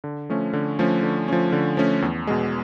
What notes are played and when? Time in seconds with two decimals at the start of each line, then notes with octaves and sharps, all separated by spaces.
0.04 D3
0.30 F3 A3 C#4
0.53 D3
0.79 F3 A3 C#4
1.03 D3
1.28 F3 A3 C#4
1.52 D3
1.77 F3 A3 C#4
2.02 E2
2.27 B2 G#3